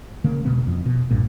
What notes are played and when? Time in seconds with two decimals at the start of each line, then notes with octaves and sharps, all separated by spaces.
0.24 C#3 A#3
0.45 E1 B2 B3
0.67 F2
0.86 B2
1.11 A#1 G2 A#2